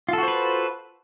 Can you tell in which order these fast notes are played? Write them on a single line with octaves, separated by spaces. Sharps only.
F4 A4 F#4 C5 B4